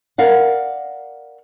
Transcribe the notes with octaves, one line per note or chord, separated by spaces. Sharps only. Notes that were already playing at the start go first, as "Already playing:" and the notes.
A#4 D5 F5 F#5